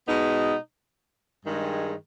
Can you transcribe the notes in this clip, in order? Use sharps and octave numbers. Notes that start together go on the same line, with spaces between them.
B2 G#3 B3 D#4
G2 D#3 G#3